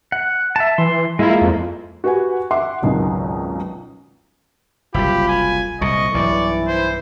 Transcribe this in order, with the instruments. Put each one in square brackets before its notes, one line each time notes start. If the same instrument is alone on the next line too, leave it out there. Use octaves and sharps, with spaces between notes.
[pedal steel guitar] F#5
E5 A5
[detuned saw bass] E3 [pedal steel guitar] C6
[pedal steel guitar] G#3 A#3 F4 [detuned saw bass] E4
[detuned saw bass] F2
[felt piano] F#4 G4 B4 F#5 G#5
E5 F#5 C6 D6
G#1 C#2 F#2 B2 D#3
[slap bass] F#1 C2 [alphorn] F4 [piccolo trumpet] G4 [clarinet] B5
[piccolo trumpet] G#5
[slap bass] C2 A#2 [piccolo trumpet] D#5 [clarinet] C#6
[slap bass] B1 G2 [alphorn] E3 [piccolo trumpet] D5
[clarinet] E4 [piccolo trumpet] C5